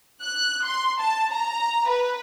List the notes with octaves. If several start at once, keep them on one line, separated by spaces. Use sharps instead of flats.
F#6
C6
A5
A#5
B4